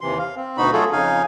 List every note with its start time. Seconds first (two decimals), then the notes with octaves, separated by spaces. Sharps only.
0.01 D#2 C3 E3 C6
0.19 F5
0.37 C4
0.57 D2 B2 D#4 F#4 B5
0.73 F#3 A3 F4 F#4 G#4 A4
0.92 F2 C#3 D#4 F5 G#5